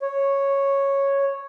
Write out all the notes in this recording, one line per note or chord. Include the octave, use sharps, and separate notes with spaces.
C#5